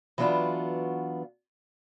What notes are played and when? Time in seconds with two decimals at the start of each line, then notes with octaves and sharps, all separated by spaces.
0.18 E3 F#3 B3 D4 F4 F#4